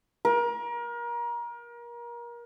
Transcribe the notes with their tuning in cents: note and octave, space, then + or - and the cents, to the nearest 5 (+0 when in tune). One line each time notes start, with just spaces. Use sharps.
A#4 +30